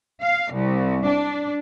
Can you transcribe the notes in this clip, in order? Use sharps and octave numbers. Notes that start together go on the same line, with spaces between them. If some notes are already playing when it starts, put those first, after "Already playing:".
F5
C2
D4